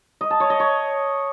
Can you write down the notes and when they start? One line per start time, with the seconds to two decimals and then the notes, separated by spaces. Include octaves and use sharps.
0.21 D#5
0.31 A5
0.40 C#5
0.50 D#5
0.60 C#5